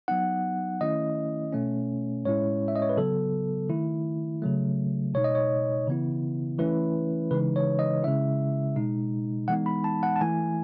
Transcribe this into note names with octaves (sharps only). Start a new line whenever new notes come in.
F#3 B3 D#4 F#5
D#3 A3 C#4 E4 D#5
B2 A3 C#4
A2 G#3 C#4 E4 C#5
E5
D#5
C#5
B4
C#3 F#3 B3 A4
D#3 A3 E4
C#3 F#3 A3
B2 G#3 D#4 C#5
D#5
C#5
C#3 E3 B3 E4
E3 A3 C#4 E4 B4
C#3 E3 G#3 D#4 B4
C#5
D#5
C#3 G#3 C#4 E4 E5
B2 G#3 D#4
E3 G#3 B3 D#4 F#5
B5
A5
F#5
A5
E3 A3 E4 G#5